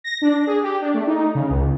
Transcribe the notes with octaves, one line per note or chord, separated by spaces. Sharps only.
A#6
D4
G#4
G4
D4
A3
D#4
C#3
C#2